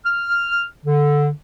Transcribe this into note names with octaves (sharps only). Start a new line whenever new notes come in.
F6
D3